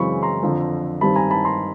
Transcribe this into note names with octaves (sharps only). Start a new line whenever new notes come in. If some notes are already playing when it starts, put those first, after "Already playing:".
Already playing: F#2 C#3 E3 G#3 C4 B5 C#6
A#5 C6
F2 D3 F3
G2 D#3 G3 C4 A5 B5
G#5 A#5
A5 B5
A#5 C6